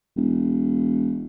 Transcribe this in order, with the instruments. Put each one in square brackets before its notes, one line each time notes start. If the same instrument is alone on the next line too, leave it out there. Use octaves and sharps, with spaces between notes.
[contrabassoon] E1